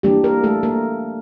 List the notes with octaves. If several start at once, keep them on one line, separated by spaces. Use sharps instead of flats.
E3 G3 A#3 D4 G4
A#3 A#4
A3 A4
A#3 A#4